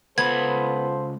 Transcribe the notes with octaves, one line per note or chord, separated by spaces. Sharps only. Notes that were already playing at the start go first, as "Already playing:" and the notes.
C#2 B3 F4 A4 C5 B5 G#6